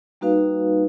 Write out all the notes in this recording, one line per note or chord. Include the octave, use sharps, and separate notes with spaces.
G3 A#3 D#4 F#4 B4 F5